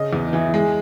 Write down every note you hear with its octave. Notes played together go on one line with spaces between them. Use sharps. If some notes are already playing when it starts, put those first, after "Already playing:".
Already playing: C#3 D#5
E2
E3
G#3